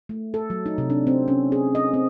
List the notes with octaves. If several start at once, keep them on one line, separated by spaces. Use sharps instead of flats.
A3
A4
F#3
D#4
C3
D4
C4
C#4
G#4
D#5
C4